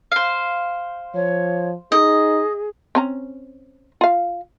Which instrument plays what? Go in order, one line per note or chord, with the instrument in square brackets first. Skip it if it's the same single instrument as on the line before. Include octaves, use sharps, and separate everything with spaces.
[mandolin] C5 F5
[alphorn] F3 [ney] C#5
[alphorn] D#4 [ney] G#4 [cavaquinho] D#5
[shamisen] C4 C#4 A#5
F4 F5